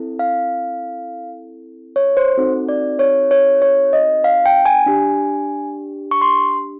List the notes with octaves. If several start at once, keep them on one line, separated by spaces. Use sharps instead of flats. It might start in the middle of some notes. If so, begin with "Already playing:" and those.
Already playing: C4 E4 A4
F5
C#5
C5
C4 D#4 F#4 A4
D5
C#5
C#5
C#5
D#5
F5
G5
G#5
D4 G4
C#6
C6